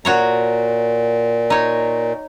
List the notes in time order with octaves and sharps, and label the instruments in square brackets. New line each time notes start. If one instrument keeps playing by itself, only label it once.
[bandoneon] A#2 [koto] F#4 C#5 A#5
[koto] D#4 C#5